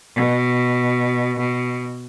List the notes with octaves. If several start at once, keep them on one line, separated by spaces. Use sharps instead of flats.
B2
B2